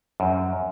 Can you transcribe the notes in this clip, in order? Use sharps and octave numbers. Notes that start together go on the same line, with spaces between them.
F#2